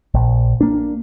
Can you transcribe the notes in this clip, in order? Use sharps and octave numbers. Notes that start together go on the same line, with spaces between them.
A#1
A#3 D4